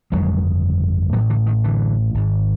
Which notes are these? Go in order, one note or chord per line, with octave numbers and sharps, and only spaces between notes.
G1 F2 C#3 F#3 G#3
A1 A2 E3 F#3
D3 E3
D#3
D3 E3
G#1 G#2